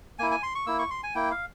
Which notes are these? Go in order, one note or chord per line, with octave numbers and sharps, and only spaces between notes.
A#3 E4 G#5
G#5
C6
C#6
A#3 E4 E6
C#6
C6
G#5
A#3 E4 G5
F5